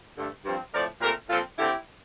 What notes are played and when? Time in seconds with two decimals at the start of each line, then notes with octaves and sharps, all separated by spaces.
0.17 G2 D3 A3
0.45 G2 F3 C4
0.73 A2 F3 A3 C4 A#4 D5
1.01 A#2 A3 C4 G4 A#4
1.30 A#2 F3 C4 F4 A4
1.58 D3 A3 C4 E4 G4